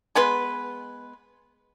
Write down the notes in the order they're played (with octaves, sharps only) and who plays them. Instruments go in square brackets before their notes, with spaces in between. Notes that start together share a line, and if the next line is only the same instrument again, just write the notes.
[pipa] G#3 B3 B4 C6